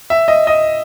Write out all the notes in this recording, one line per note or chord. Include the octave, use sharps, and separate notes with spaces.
E5
D#5
D#5